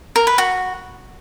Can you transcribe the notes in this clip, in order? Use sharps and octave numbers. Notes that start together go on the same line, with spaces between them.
A#4
B4
F#4